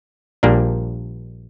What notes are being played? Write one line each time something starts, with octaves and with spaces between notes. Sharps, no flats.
A#1 A#2 G3 A#3 D4